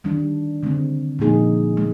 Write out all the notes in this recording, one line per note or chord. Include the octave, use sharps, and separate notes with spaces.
D#3 G3 D4
D3 G#3 C4
A#2 F3 A#3 D#4 G#4
G#3